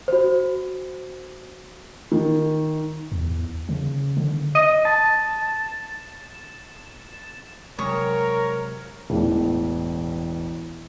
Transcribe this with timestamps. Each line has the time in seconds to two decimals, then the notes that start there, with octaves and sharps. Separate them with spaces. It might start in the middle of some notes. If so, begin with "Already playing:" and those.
0.08 F#4 C5
2.12 D#3
3.12 E2
3.69 C#3
4.17 D3
4.55 D#5
4.85 A5
7.79 C3 F#3 G#3 A#4 C#5 C#6 D#6
9.10 E1 A1